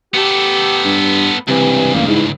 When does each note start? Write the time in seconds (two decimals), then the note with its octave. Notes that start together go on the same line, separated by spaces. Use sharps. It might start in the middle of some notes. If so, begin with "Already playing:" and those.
0.14 B3 G4 A4
0.85 G2
1.48 C#2 G2 C3 E3
1.94 A1 A#3
2.07 G#2 E4